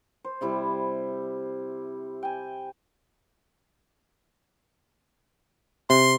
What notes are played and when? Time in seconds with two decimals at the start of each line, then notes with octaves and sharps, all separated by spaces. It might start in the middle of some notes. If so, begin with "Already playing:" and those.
0.24 C5
0.41 C3 G3 E4 C5
2.23 G5 G#5
5.90 C3 C6